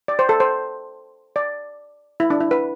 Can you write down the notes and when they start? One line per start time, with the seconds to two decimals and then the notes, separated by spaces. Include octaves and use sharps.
0.08 D5
0.19 C5
0.29 A4
0.40 C5
1.36 D5
2.20 E4
2.30 D4
2.40 E4
2.51 B4